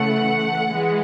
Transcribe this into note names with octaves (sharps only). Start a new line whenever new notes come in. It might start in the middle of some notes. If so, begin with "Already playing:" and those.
Already playing: C#3 E3 A3 F#5
E3 G#3